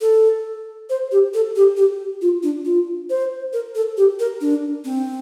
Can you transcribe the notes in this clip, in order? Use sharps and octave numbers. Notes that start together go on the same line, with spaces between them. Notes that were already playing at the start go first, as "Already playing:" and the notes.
A4
C5
G4
A4
G4
G4
F4
D4
F4
C5
A#4
A4
G4
A#4
D4
C4